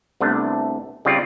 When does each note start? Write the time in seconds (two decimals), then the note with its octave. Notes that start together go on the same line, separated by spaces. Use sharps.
0.20 C2 C3 A3 B3 D4
1.05 C#3 G3 C4 F4 D5